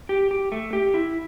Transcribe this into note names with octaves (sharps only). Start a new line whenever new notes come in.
G4
G4
A3
G4
E4